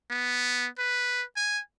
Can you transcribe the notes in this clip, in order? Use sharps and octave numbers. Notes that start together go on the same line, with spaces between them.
B3
B4
G#5